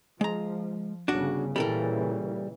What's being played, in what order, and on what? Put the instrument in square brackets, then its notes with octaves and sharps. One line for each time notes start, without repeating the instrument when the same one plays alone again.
[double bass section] F3 [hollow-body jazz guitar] G#3 A#5
[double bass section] G1 C#3 [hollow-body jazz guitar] D4 F#4
[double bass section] A#2 C#3 E3 [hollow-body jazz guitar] G3 A4 A#4